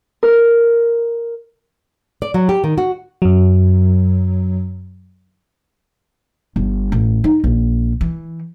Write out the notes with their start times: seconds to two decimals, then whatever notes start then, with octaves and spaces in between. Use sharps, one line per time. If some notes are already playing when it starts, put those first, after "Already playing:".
0.23 A#4
2.22 D5
2.34 F#3
2.49 G4
2.64 D#3
2.78 F#4
3.22 F#2 F#3
6.56 G1
6.92 A1
7.24 D#4
7.44 A#1
8.01 E3